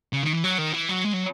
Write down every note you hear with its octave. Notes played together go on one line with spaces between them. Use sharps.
C#3
D#3
E3
F#3
D#3
E3
F#3
G#3
F#3